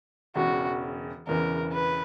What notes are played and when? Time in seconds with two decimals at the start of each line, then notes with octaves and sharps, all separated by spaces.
0.36 E1 E2 C#3 F#4
1.27 E1 E2 C#3 E3 A#4
1.73 B4